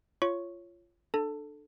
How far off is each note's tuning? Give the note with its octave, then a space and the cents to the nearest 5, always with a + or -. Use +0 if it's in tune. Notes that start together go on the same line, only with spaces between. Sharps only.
F4 -15 C#5 +0 C#6 +0
D4 +25 A4 -5 A5 +20